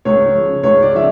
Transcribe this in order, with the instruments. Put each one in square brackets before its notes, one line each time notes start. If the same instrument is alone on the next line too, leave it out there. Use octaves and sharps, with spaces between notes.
[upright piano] C#2 C#5
C#3 F3
C#2 C#5
D5
C#3 F3 E5